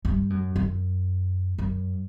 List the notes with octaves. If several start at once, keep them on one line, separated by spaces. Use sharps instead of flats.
G2
F#2
F#2
F#2